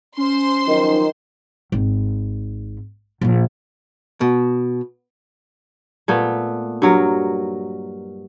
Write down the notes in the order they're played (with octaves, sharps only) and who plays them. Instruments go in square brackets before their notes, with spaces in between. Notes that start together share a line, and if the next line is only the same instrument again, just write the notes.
[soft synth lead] C#4 [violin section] C5 C6
[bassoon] D#3 [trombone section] F3 F#3 D#4
[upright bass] G#1
A#1 F4
[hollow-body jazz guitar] B2
[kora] A#2 A3 B3
G2 F#3 A#4